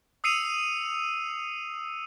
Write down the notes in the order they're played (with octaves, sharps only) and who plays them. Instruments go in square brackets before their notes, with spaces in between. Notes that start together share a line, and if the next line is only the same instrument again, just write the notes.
[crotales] D#6 E6 C7 C#7 D#7 F7